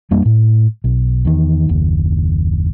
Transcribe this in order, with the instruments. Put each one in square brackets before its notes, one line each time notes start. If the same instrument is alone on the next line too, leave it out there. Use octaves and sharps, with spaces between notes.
[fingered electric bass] F2 G3 A#3 D4
A2
B1
E2 D#3
F#1 D#2